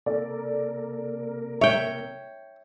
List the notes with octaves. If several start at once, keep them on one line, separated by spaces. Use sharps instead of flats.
C3 A#3 A4 A#4 D5
C#5 E5 G5